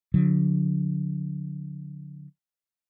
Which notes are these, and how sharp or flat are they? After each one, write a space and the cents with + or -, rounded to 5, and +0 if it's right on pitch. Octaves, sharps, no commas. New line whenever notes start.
D3 -15 F#3 -45